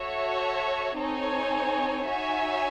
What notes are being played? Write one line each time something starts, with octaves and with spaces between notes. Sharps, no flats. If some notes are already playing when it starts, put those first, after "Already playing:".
Already playing: F#4 A4 C#5 E5
C4 D#4 A4 C#5 G#5
D#4 F#4 C#5 E5 G#5